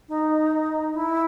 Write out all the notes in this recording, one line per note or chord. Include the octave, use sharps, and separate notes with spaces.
D#4
E4